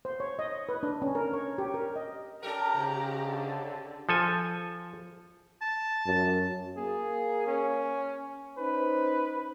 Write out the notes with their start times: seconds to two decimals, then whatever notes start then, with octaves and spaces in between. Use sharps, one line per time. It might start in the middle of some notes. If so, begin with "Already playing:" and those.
0.05 C5
0.20 C#5
0.39 D#5
0.69 B4
0.83 D4
1.02 C#4
1.15 A#4
1.33 C#5
1.58 G4
1.74 A#4
1.96 D#5
2.43 C#4 G4 A4 A#4 A#5
2.75 G#2 C#3
3.26 D3
4.09 F3 A4 G#5
5.61 A5
6.06 F#2
6.77 A#3 G#4
7.47 C#4
8.58 C#4 D#4 B4 C5